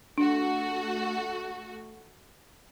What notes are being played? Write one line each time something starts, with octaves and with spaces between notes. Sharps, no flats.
A3 D4 F#4